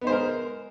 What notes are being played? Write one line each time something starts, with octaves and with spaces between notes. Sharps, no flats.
G#3 B3 D#4 A#4 C5